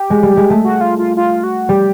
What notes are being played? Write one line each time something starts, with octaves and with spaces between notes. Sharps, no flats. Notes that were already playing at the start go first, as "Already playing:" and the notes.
Already playing: G4
G#3
G3
G#3
A3
F#4
F4
F4
F4
F#4
G3 G4